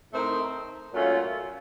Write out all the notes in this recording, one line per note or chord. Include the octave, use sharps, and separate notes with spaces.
A2 A3 C4 D#4 A#4
A#2 F#3 A3 C#4 F4